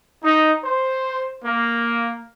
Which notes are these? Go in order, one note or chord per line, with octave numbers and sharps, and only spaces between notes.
D#4
C5
A#3